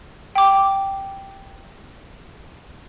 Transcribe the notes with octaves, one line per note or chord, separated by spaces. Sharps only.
G5 D6